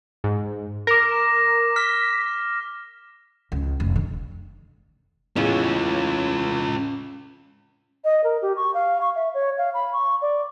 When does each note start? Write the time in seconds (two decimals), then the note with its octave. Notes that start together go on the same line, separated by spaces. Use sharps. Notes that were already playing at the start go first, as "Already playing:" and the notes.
0.24 G#2
0.87 A#4 D6 A#6
1.11 E7
1.76 F6 B6
3.52 C#2
3.80 F1
3.96 D3
5.36 E2 A2 C#4 F4
8.04 D#5
8.24 A#4
8.42 G4
8.56 C#6
8.74 F5
9.01 C#6
9.15 E5
9.34 C#5
9.58 F5
9.74 B5
9.93 C#6
10.22 D5